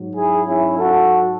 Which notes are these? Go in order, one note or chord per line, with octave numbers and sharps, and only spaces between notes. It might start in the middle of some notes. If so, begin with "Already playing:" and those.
Already playing: G#2 F#3
E4 G#4
C#4 E4
F#4 A4